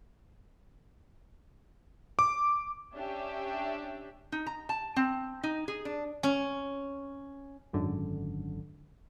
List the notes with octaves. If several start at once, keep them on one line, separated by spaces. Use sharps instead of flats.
D6
C#4 D4 G4 E5
D#4
A#5
A5
C4
D#4
G#4
D4
C#4
G#1 F#2 D3